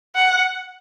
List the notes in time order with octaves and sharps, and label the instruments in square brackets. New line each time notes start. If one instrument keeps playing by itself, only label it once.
[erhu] F#5